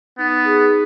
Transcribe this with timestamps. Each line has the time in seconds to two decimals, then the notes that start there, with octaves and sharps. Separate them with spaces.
0.18 B3 D#4
0.45 G#4